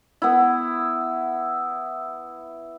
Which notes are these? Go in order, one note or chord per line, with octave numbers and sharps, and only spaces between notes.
B3 E4